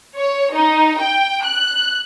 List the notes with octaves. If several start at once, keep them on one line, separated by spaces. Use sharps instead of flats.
C#5
D#4
G5
F#6